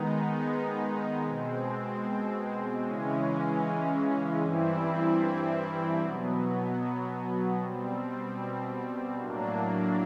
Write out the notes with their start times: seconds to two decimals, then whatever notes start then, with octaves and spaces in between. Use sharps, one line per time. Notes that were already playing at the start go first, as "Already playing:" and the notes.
Already playing: D#3 G#3 B3 D#4
1.22 B2 G#3 C4
2.81 C#3 E3 G#3 C#4
4.41 G2 E3 G3 C4 E4
5.99 B2 F#3 B3
7.58 B2 G3 C4
9.17 A2 F#3 A#3 D4